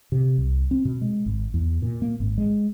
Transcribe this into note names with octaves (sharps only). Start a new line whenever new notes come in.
C3
C2
C4
B2
G#3
G#1
E2
A#2
A#3
G#1
G#3